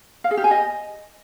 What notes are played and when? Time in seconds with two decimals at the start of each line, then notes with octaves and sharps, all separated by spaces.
0.24 F5
0.31 G#4
0.37 G4
0.44 G#5
0.51 D#5